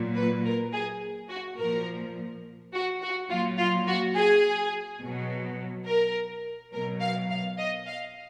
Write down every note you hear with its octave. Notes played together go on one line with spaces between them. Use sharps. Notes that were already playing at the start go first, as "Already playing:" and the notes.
Already playing: A#2 F#3
B4
A#4
G#4
F#4
A#2 F3 A#4
F#4
F#4
A#2 F#3 F4
F4
F#4
G#4
B2 F#3
A#4
B2 F#3 A#4
F5
F5
D#5
F5